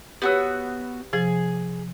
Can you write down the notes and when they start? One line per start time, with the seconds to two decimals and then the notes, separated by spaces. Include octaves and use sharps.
0.22 B3 F#4 G4 B4 C#5 E6
1.13 C3 F3 G#4